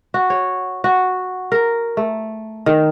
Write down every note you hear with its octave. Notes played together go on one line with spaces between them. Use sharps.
F#4
C#5
F#4
A#4
A3
D#3